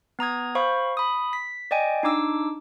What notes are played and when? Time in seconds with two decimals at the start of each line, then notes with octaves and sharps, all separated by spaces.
0.19 B3 A#5 D#6 G#6
0.55 C5 F5 B5 C#6
0.97 B5 D#6
1.33 B6
1.71 D5 D#5 G5 G#5
2.03 D4 D#4 D6 E6